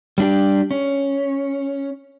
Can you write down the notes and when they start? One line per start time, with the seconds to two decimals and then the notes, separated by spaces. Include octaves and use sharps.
0.18 G3 D4 G4
0.71 C#4